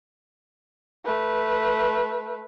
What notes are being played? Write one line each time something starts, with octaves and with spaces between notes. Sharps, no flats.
A3 B4